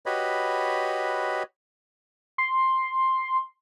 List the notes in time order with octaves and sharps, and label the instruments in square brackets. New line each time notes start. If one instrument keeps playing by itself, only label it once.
[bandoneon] F#4 G4 B4 C#5 D#5 B5
[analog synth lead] C6